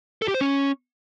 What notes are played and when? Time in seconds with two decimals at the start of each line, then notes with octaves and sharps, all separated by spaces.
0.22 A4
0.28 G4
0.34 C5
0.41 C#4